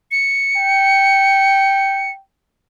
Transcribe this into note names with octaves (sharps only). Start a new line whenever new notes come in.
C#7
G5